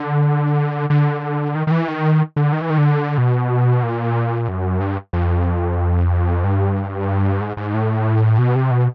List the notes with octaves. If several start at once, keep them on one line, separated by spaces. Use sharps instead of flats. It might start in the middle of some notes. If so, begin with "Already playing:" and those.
Already playing: D3
D3
D#3
D#3
E3
D#3
D3
D#3
E3
D#3
D3
B2
A#2
F#2
G2
F2
G2
G#2
G#2
A2
B2
C3
B2